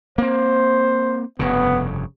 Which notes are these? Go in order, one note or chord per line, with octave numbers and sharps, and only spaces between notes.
A#3 C4 C5
F1 G2 C#3 B3